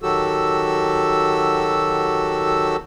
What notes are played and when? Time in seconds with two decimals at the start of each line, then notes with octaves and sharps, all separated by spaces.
0.02 D#3 F#3 F#4 G4 A4 E6